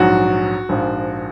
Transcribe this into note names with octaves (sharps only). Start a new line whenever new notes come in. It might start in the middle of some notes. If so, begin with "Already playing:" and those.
Already playing: A#1 G#2 F#3 F#4
A#1 G#2 F3